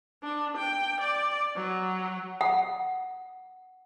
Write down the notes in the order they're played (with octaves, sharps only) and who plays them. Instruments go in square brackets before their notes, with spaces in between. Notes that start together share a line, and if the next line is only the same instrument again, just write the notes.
[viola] D4
G5
D5
F#3
[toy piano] F#5